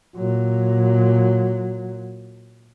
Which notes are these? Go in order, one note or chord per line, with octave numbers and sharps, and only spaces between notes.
A#2 F#3